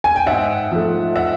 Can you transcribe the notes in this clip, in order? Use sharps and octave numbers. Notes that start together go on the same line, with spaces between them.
G#5
G5
G#2 E5 F#5
F3 A3
E5 F#5